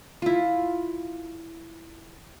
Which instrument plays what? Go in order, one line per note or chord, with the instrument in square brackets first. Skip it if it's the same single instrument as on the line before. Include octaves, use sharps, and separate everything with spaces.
[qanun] E4 F4